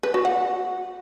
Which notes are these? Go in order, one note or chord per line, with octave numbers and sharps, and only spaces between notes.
B4
F#4
F#5